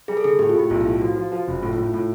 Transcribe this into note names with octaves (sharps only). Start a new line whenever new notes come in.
G3 G#4
A4
D3 G#4
A2 G4
F4
A2 G4
B1 F4
E4
A2
F3 F#4
F3
F3
F#1
A2 F4
F4
A2
E4
A2 F4